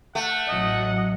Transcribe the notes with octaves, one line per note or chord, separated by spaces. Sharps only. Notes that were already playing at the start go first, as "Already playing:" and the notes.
A3 F#5
A1 F#3 D#5